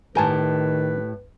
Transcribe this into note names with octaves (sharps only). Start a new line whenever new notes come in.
A2 D#3 G4 A#4 B4 G#5 A5